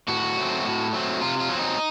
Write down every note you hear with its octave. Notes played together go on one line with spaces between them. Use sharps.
A2 F#4
F#3 A3 C4
A2
F#3 A3 C4
C3 F4
F4
F#3 C4
D#4